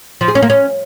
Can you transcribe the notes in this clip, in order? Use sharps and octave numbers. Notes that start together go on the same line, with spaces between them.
F3
G#4
C#4
A#3
C#4